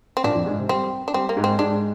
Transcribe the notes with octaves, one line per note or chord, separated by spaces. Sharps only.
C4
A#2 A#3 D4
F2 F3
G#2 G#3
C3 C4
G3 C4 G4
D4
G3 C4 G4
A#3
G#2 G#3
C4
G#2 G#3 D4